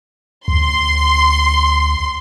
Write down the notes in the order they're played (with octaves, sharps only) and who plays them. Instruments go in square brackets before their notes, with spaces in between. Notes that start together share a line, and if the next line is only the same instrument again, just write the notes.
[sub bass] D2 [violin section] C6